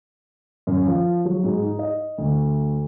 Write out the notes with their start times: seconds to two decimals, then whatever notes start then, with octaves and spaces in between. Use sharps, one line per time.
0.67 F#2
0.87 F3
1.25 F#3
1.44 G#2
1.62 D#4
1.79 D#5
2.18 D2